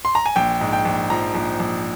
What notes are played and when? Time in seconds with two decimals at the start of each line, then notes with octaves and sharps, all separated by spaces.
0.05 C6
0.15 A#5
0.26 G#5
0.36 A#1 G5
0.61 G#2
0.73 G5
0.85 A#1
1.10 F3 A#5
1.35 A#1
1.60 A#1